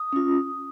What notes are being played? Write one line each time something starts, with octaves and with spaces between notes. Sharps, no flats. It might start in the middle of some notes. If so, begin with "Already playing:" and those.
Already playing: D#6
C#4 F4